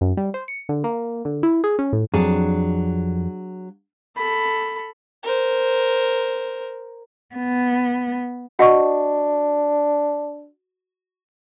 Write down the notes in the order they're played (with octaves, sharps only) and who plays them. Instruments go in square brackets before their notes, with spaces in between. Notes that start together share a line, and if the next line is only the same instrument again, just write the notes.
[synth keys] F#2
G3
C5
C#7
D3
A#3
D3
E4
G#4
C#4
A2
[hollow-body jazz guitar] F2 [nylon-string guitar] F#3 D4 G#4
[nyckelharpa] A4 B5
[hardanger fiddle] A#4 C5
[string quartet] B3
[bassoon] D4 [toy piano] F#4 C#6 [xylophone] D#5 F#5